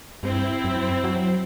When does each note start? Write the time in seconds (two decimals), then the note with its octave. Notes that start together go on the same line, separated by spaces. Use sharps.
0.23 G2 C4 E4
0.64 F#2
1.04 F#3